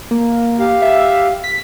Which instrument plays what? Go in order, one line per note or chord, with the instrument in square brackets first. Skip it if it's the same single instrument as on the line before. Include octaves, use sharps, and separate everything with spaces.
[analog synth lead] A#3
[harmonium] G4 F5
[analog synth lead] E5
B6